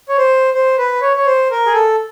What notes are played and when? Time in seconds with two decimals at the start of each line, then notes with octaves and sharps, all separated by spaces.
0.09 C#5
0.18 C5
0.54 C5
0.78 B4
1.01 C#5
1.17 C#5
1.26 C5
1.51 A#4
1.66 G#4
1.74 A4